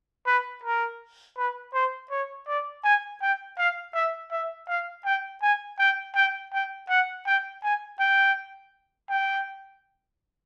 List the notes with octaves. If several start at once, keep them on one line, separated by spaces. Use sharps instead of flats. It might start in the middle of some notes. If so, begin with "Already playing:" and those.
B4
A#4
B4
C5
C#5
D5
G#5
G5
F5
E5
E5
F5
G5
G#5
G5
G5
G5
F#5
G5
G#5
G5
G5